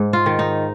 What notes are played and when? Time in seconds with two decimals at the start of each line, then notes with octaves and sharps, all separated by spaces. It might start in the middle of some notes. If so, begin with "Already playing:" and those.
Already playing: G#2
0.13 F4
0.26 D#3
0.39 D#4